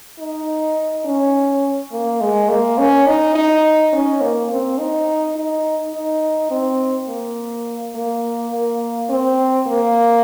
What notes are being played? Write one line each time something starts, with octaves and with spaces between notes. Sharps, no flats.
D#4
C#4
A#3
G#3
A#3
C#4
D#4
D#4
C#4
A#3
C4
D#4
D#4
D#4
C4
A#3
A#3
A#3
C4
A#3